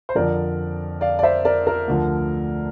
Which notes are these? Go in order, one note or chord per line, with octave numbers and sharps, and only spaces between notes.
C5
F2 D3 F3 A#4 D5
D5 F5
D5
C5 E5
A#4 D5
A#4
D2 D3 F3